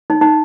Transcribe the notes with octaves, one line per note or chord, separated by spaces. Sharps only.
D#4
D#4